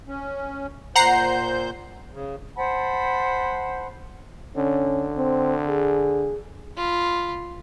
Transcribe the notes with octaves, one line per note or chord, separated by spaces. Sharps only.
C#4
A#2 C5 F#5 A#5 G6 C7
C#3
C5 F#5 A5 B5
D3 C#4
C4
G#4
F4 B5